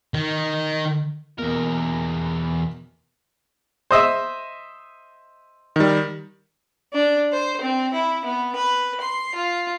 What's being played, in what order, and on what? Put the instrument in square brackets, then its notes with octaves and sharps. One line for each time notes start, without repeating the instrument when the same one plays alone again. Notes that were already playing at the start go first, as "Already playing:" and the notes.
[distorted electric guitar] D#3
[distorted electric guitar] E2 A#4 [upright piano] B2 A#3
[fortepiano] C5 D#5 E5
[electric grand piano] D#3 G3
[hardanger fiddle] D4
C5
C4
E4
B3
B4
C6
F4